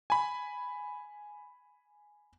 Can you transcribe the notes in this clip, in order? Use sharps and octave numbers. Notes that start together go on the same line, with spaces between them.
G#5 B5